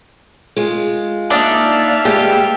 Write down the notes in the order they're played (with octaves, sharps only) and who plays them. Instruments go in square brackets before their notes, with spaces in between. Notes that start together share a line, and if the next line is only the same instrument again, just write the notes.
[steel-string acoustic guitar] G#3 F4
[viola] A#3 F5 [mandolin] D4 D#4 [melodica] E5 A5
[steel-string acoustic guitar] G#3 B3 [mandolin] G4